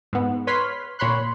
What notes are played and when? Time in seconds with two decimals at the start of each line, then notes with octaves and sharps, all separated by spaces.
0.13 G#2 B3
0.47 B4 C#5 B5 C6 F6 B6
0.99 A#2 C#5 B5 C6 F#6